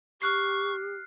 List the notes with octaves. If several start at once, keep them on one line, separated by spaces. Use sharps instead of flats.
G4 C#6 F6 F#6 C7